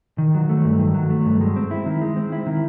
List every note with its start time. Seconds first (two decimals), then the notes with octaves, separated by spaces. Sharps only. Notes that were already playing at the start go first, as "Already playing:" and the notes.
0.18 D#3
0.35 F#3
0.49 A3
0.64 G2
0.79 D#3
0.94 F#3
1.10 A3
1.26 G2
1.41 G#3
1.56 C4
1.71 E4
1.86 D#3
2.02 G#3
2.16 C4
2.32 E4
2.46 D#3